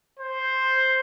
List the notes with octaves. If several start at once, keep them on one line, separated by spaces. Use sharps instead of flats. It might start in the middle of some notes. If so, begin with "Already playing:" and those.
C5